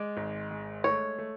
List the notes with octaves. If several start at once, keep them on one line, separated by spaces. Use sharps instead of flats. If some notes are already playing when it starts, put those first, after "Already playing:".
Already playing: G#3 D5
G#1
G#3
A3 C#5
A3